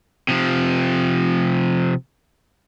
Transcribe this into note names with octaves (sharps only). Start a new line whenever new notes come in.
C3 F3